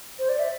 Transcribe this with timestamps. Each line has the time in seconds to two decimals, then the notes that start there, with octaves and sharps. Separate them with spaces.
0.19 C5
0.29 D5
0.39 E5